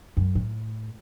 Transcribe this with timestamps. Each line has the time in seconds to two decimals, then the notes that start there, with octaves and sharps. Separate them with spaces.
0.17 F#2
0.35 A2